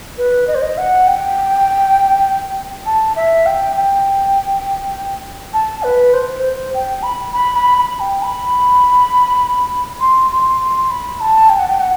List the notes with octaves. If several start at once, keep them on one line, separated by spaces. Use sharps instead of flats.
B4
D#5
C5
D#5
F#5
G5
A5
E5
G5
G5
A5
B4
C5
C5
G5
B5
B5
B5
B5
G5
B5
C6
C6
C6
B5
A5
G5
F#5
G5
F#5